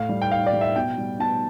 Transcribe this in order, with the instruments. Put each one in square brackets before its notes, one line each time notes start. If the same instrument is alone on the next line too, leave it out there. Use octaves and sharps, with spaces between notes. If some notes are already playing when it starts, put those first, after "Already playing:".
Already playing: [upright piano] A2 F5
G3
G5
A2 F5
D5
G3
E5
B2 G5
G3
B2 A5